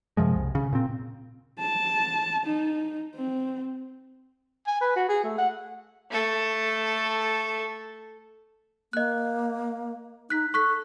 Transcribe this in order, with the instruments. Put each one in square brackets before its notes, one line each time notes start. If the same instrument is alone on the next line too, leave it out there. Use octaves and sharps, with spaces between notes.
[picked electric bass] F#2 C3 F3 G#3
C2
C#3
A#2 C4
[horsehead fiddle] A5
D#4
C4
[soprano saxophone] G#5
B4
F#4
G#4
A3
F#5
[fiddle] A3 A4
[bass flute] A#3 [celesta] D#5 F#6
[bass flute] D#4 [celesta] F#6 B6
[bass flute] A4 [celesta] C#6 F#6 B6